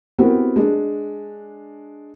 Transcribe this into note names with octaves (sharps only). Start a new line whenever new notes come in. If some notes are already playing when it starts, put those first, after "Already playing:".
B3 C4 E4 F#4 G4 A#4
G#3 D4